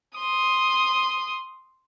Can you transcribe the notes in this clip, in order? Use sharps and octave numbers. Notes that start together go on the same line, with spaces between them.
C6 D#6